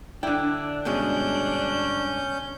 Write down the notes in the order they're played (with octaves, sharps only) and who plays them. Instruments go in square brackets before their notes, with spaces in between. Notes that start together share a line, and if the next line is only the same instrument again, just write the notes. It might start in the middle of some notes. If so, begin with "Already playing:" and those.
[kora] D3 E4 [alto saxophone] D4 [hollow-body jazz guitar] G5
[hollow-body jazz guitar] G2 B2 G#3 [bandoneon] C#4 G6